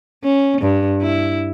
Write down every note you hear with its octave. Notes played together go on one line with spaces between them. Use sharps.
C#4
G2
E4